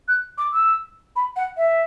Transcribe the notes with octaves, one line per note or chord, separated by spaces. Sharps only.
F#6
D6
E6
B5
F#5
E5